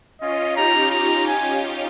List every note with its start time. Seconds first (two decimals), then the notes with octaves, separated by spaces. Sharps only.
0.21 C#4 F4 D#5
0.56 D#4 G4 A#5
0.91 A#5
1.27 G#5